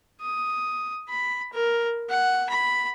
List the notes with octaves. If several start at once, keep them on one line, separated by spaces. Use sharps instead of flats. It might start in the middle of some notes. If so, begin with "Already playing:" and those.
D#6
B5
A#4
F#5
B5